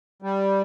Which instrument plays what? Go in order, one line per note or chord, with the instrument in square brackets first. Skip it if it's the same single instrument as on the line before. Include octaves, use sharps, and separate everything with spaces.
[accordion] G3